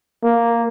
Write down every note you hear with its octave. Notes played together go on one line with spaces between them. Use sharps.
A#3